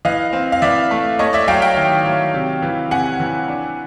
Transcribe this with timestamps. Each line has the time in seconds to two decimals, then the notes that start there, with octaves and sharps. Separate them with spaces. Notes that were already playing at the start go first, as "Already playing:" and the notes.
0.05 E3 D#5 F5
0.33 C4
0.52 F5
0.62 E3 D5 E5
0.91 A3
1.19 A3 C#5 D#5
1.33 D5 E5
1.48 F#3 F5 G5
1.62 F5 G5
1.76 D#3
2.06 F#3
2.34 C3
2.63 E3
2.91 C3 F#5 G#5
3.20 E3
3.48 D4